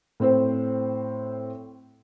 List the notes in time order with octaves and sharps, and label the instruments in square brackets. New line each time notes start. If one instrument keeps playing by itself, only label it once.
[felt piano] A2 C4 C5